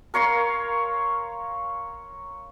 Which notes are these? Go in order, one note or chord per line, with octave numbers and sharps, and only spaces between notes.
A#4 C#5 F5 C6